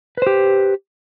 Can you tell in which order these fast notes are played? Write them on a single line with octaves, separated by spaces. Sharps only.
B4 C5 G4